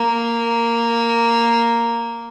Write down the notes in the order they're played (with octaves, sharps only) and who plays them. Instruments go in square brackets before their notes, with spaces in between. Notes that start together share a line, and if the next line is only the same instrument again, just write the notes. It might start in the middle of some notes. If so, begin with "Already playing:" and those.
Already playing: [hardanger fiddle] A#3